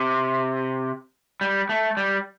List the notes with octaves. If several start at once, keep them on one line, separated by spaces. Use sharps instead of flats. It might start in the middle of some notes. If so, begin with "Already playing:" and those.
Already playing: C3
G3
A3
G3